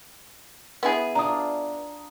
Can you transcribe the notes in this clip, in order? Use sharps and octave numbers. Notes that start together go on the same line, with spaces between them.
B3 E4 G#4
D4 F4 A#5 D#6